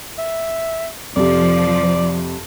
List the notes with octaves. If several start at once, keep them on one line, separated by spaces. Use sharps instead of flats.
E5
F2 C3 F3 D5